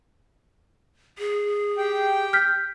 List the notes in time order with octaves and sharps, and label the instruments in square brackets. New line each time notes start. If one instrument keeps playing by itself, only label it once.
[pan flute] G#4
[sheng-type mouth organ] G4 G5
[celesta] F6 G6 B6